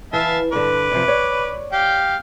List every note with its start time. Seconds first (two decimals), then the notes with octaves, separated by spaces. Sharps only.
0.13 E3 E5 F5 A5
0.53 G2 D3 B4 D6
0.91 F#2 C3 F3
1.08 C#5 D5
1.73 G4 F5 G5